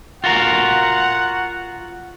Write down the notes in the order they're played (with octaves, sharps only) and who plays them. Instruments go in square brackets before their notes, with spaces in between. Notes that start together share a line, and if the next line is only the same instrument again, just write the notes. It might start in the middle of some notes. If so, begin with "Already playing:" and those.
[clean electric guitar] F4 F#4 A#4 [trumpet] F#5